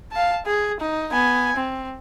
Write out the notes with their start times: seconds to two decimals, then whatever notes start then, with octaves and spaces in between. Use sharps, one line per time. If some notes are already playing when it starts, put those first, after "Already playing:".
0.12 F5 A5
0.46 G#4
0.80 D#4
1.12 B3 G#5
1.56 C4